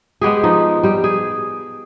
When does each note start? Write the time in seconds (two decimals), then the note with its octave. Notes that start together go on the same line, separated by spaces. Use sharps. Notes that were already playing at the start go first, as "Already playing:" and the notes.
0.21 G#3 B3 G4 G#4
0.43 F3 D#4
0.83 G3 G4
1.04 G#4